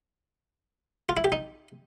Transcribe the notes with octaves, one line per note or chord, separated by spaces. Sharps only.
F4
E4
G4
D#4